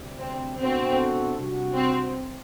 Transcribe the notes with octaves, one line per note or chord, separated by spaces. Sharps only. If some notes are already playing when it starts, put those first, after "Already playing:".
Already playing: D2 C3 G3 D4
C4
B2 A3 C4 D4 F#4 A4
C3 G3 D4 F#4
C4